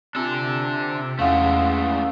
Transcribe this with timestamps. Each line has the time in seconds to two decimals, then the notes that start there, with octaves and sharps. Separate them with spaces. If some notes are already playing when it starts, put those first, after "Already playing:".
0.15 C3 D4 F4 G4 A4 G#5
1.19 E2 G#3 A3 C#4 F5 F#5 G#5